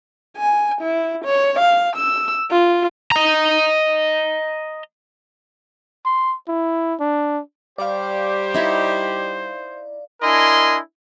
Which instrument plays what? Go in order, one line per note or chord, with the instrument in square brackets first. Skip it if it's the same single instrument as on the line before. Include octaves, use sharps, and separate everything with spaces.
[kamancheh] G#5
E4
C#5
F5
E6
F4
[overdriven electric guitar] D#5 A#5
[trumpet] C6
E4
D4
[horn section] G3 G4 [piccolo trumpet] C5 [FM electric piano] D5 F5
[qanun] D#4 E4 C#5
[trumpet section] D4 E4 A#4 D#5 G#5 C6